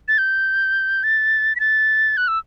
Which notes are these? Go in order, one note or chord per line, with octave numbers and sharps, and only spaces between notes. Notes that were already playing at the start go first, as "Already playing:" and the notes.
A6
G6
A6
B6
A6
F#6
E6